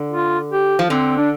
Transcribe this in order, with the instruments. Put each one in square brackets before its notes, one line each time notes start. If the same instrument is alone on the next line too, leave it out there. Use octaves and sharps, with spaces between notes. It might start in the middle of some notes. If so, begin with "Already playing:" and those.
Already playing: [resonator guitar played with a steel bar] D3
[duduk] F4
G4
[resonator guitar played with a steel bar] F3
[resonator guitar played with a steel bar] D3 [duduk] C4
[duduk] D4